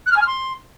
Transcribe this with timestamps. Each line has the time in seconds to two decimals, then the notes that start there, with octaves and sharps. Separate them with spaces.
0.05 F#6
0.11 F6
0.16 G#5
0.21 F6
0.26 C6